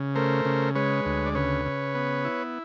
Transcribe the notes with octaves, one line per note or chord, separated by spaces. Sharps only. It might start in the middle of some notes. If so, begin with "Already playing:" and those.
Already playing: C#3
A3 A#4 C5
C#3
G#3 B4 C#5
D2
D5
C#3 B4 C#5
C#3
B3
E4